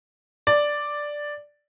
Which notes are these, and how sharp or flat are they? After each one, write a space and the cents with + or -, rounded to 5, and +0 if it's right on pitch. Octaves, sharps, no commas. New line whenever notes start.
D5 +0